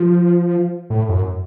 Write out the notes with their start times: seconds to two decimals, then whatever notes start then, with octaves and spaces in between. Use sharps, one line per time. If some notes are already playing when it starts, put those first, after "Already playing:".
Already playing: F3
0.90 A2
1.09 F#2